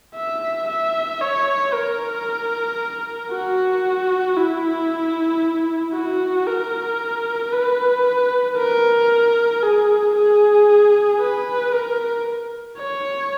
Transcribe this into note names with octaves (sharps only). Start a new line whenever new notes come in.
E5
E5
C#5
A#4
F#4
E4
F#4
A#4
B4
A#4
G#4
G#4
B4
A#4
C#5